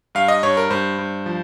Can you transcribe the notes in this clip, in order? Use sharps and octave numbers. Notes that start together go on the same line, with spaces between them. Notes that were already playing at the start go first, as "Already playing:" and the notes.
G2 F5
D#5
G2 C#5
A#4
G2 C5
G2
F3